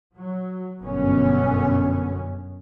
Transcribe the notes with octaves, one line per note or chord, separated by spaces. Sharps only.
F#3
G1 F#2 B2 D3 B3 C#4